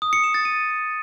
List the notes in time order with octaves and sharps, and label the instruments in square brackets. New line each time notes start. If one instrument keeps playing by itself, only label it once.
[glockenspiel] D#6
C#7
E7
A6
D#7